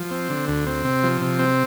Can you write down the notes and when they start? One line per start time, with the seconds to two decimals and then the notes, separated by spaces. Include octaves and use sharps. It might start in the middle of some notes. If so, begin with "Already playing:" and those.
Already playing: F3
0.11 C4
0.30 D3
0.48 D2
0.67 C4
0.85 C3
1.03 F3
1.22 C3
1.39 C4